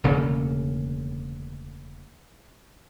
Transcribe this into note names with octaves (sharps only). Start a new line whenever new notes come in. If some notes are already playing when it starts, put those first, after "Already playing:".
E1 D2 C#3 A#3